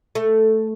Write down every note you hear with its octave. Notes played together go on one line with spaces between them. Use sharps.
A3